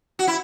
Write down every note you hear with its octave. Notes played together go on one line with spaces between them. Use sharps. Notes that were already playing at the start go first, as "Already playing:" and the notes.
F#4
E4